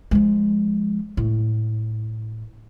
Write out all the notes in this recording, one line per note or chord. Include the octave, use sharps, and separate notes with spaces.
F3 G#3
A2